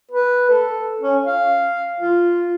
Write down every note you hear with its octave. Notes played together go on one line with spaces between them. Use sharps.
B4
A4
C#4
F5
F4